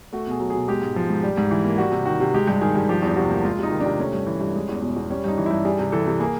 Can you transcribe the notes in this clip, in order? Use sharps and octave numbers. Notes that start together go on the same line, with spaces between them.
A3 F#4
B2 G#4
F#3
B2 G#4
G#3 G4
G#2
F3
G#2
G3
G#2
E3
A#3
G3 F#4
C3
D#3 F#4
C3
G#3 G4
G2
D#3 G#4
G2
F3 G4
E2
C3 F#4
A#3
G#3 F4
C3 D#4
D#3
D4
C3
A3 C#4
G2
E3
G2
G#3
E2
B2
E2
G3 C#4
G2 D#4
E3
G2 E4
G3 G#4
C3
E3 A4
C3
A#3 G#4